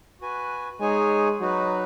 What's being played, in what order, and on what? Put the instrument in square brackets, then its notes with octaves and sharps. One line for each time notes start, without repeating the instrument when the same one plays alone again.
[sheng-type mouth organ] F#4 B4 G#5
[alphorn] G#3 [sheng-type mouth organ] D#4 G#4 C#5 G#5
[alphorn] F#3 [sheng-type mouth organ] D#4 F#4 B4